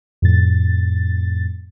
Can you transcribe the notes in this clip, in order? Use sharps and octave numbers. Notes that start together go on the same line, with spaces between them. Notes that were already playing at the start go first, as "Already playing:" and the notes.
F2 A2 A6